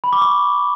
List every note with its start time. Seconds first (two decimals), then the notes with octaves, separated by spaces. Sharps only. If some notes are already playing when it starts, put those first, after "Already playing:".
0.04 B5
0.13 D6
0.21 C#6